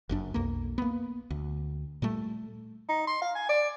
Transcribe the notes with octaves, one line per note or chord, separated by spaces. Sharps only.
F#1 F#2 D4
B1 F2 A#3
A#3 B3
D2
A#2 G3 A3
D#4
C6
F5
G#5
D5